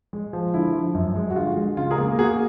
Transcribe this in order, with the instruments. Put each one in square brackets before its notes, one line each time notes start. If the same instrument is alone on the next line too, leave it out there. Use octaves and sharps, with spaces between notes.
[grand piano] G#3
F3
D3 E4
F3
F#2
G#3
F#4
D3 F4
G#3
C#3 F4
G#4 A#4
A#3
A#3 F#4 G#4